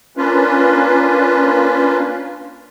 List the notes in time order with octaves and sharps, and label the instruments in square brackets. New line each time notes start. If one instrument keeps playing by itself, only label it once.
[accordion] A#3 C#4 D4 F4 B4